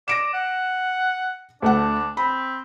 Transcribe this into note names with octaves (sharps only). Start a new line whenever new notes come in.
D5 A#6 D7 E7
F#5
D2 A3 D4 F#5
C4 B5